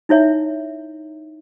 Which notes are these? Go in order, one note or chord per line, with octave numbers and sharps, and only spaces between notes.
D#4 E4 C#5 E5